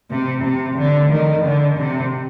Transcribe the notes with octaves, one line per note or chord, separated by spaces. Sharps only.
C3
C3
D3
D#3
D3
C3